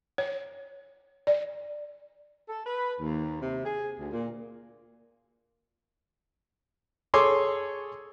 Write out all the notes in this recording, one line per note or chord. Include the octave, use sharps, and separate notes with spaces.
C#5
D5
A4
B4
D#2
C3
G#4
D2
A#2
G#4 A4 C#5 G#5 C6 D6